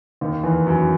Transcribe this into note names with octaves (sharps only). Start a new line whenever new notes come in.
D#2 D#3
E2 E3
F#2 F#3